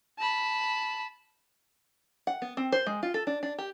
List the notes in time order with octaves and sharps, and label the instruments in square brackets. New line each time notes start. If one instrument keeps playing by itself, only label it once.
[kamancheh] A5 B5
[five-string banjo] F#5
B3
C4
C5
G#3
F4
A4
D4
D4
G4